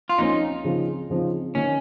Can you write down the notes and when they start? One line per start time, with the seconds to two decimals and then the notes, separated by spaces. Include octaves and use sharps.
0.09 F4
0.18 F3 A#3 C#4 D#4
0.64 C#3 F3 C4 D#4
1.10 C#3 F3 C4 D#4
1.55 D#3 A#3 C#4 D#4